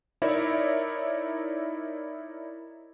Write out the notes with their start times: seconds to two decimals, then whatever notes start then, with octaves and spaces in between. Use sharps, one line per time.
0.22 D#4 E4 A#4 C#5 D5 E5